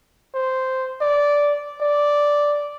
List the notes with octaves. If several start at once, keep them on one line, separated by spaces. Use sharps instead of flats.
C5
D5
D5